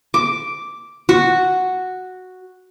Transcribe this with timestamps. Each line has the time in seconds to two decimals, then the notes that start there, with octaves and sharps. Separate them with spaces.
0.14 D6
1.09 F#4